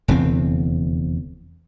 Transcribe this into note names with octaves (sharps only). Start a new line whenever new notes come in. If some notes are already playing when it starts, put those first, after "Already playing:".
F1 E2 D3 C4